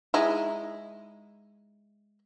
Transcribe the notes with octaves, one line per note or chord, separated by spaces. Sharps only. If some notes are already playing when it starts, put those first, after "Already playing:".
G#3 D#4 E4